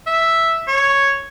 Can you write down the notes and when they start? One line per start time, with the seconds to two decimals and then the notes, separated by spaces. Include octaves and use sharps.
0.07 E5
0.68 C#5